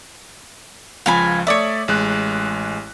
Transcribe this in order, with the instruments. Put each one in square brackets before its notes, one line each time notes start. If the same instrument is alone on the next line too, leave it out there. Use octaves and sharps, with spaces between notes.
[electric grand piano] C#2 F3 [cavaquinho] F5 G#5 B5
[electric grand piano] A3 D5 E5 [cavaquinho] C#5 D#6
[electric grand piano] A1 G#3 F#6